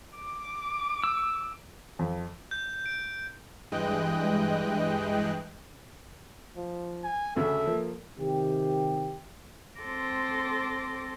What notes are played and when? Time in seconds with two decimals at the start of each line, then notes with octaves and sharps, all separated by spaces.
0.16 D6
1.04 E6
1.99 F2
2.51 G6
2.86 D7
3.72 G2 E3 G#3 D#5 G5 F#6
6.57 F3
7.04 G#5
7.36 D2 C#3 A4 E5
7.67 F3 A#3
8.18 C3 D#3 G4
9.80 C4 A4 C6 D6 A#6